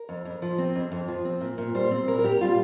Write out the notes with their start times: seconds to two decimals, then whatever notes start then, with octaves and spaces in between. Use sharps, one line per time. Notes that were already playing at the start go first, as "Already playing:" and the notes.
Already playing: A#4
0.09 F2
0.25 F2
0.42 F3
0.58 C4
0.75 F2
0.92 F2
1.08 F3
1.25 C4
1.41 A#2
1.58 A#2
1.75 G3 C5
1.91 C4
2.07 A#2 A#4
2.19 A#4
2.24 A#2 G4
2.41 G3 F4